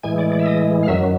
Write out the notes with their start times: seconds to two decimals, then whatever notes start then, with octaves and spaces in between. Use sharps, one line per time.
0.03 A2 E3 G#3 G#5
0.18 D5
0.32 D5
0.39 E5
0.46 D#5
0.83 F5
0.88 F#2 D#3 F#3 E5